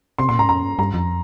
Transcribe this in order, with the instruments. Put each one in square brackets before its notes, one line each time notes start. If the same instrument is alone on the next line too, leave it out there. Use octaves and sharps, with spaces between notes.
[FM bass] C3 [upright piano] C6
[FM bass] A#2 [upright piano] C6
[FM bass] G#2 [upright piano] A#5
[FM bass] F2 [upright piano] A#5
[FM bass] G2
[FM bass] G2 [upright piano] A#5
[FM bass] F2